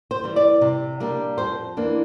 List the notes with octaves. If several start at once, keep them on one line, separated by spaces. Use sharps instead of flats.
C5
E3 G3
D5
C3
G3 A#3 D4
F2 C5
E3 A#3 D4